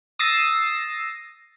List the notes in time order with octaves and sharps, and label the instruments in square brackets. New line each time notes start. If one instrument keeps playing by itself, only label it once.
[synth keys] D#6 E6 A6 A#6 C7